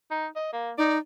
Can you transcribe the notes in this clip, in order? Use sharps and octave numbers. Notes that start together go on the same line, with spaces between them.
D#4
D#5
A#3
D#4 D5